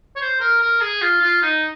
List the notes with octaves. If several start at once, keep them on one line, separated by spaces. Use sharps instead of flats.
C#5
C5
A#4
A#4
G#4
F4
F4
D#4